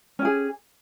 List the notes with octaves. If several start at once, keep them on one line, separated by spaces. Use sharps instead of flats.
C#4 G4 G#4